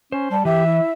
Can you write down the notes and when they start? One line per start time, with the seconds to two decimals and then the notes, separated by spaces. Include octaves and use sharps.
0.12 C#4 C5
0.31 G3 A5
0.45 E3 G4 E5
0.66 E4